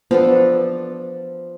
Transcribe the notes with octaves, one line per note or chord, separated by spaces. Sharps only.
F3 B3 D4 A4